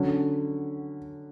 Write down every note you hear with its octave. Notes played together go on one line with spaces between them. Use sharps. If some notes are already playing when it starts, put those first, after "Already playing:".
Already playing: D3 F#3 C#4